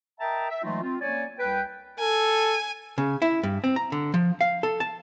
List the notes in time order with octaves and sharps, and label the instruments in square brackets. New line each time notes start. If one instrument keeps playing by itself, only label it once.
[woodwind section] A#4 D#5 E5 G5 A5 A#5
E5
E3 F#3 G#3 A3 D#4 F4
C4 F4
A#3 C#4 C#5 D5 G#5
C2 B4 G5
[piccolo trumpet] A4 [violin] G#5
[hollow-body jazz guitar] C#3
E4
G2
C4
A#5
D3
F3
F5
A4
A5